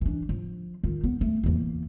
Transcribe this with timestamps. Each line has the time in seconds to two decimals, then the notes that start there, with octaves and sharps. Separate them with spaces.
0.01 E3 D4
0.29 F3
0.83 D#3 F4
1.04 B3
1.21 A3
1.43 E2 A#3